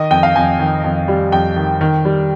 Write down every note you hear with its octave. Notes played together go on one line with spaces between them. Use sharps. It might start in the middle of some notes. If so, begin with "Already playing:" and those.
Already playing: D#3 D#5
F2 G5
F5
F2 G#5
D#3
F2
G3
F2 G5
D#3
D#3
G3